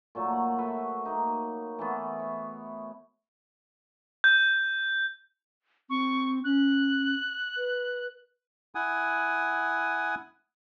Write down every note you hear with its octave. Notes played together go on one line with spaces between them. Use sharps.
A#2 F#3 A3
F#5
F#4 A4 B4 E5
A#3 D#4
E3 A3 B3
C#5
G6
C4 C#6
C#4 F#6
B4
E4 F#5 G#5 D#6